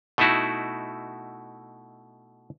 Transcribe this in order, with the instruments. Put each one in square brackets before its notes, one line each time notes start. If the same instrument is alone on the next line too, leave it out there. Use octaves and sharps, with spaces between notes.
[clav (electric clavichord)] B2 A3 D#4 E4 F#4